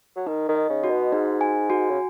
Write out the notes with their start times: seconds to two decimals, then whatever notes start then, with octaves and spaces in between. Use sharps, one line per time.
0.16 F#3
0.26 D#3 D#4
0.48 D#3
0.55 D#5
0.69 C#3
0.84 F#4
0.90 B2
1.12 G#2 D#4
1.41 G#5
1.70 F#4
1.90 C#3